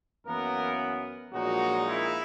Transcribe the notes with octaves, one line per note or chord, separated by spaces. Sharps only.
F#2 E3 A#3 B3 A#4
A#1 A#2 F#3 G#3 D#4 F#4
E4